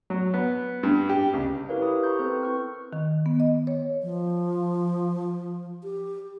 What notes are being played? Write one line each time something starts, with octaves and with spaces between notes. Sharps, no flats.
F#3
B3
G2
G4
C#2
E4 G4 A#4 B4 C#5 F5
G4 A#4 C5 B5 D#6
A#5 B5 C#6 G6
C4 A4 B4 C5
E4 C#6 F6
D#3
B3
D#5
C#5
F3
G4